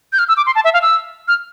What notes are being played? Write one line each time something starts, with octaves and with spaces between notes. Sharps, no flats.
G6
F6
E6
D6
C6
A5
E5
F5
E6
F6